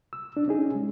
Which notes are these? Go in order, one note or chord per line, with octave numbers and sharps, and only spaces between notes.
E6
D4
C#4 D#4 G#4
G#3